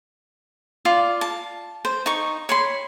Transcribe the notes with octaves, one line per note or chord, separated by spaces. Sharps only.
F4 D5
A5
C5
D#4 C#6
C#5 B5 C6